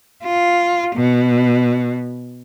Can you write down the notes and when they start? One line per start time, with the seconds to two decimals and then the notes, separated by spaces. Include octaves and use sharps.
0.24 F4
0.95 B2